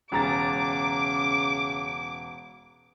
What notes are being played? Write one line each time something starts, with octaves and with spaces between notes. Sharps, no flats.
E1 C#3 A#5 D6 A6